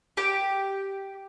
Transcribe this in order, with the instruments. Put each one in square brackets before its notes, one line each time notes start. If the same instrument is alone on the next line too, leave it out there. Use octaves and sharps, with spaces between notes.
[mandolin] G4 G5